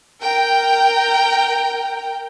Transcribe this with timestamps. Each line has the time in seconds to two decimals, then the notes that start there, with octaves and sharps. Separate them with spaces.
0.21 A#4 G5